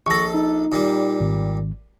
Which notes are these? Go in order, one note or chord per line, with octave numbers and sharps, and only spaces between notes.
A#1 A4 C#6 A#6
D#4
A#2 G3
G#1